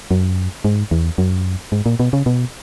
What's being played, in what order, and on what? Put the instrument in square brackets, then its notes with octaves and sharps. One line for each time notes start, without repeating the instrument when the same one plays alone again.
[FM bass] F#2
G#2
E2
F#2
G#2
A#2
B2
C#3
B2